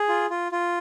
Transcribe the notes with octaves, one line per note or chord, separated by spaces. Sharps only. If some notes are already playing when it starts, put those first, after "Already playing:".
Already playing: G#4
F4
F4
F4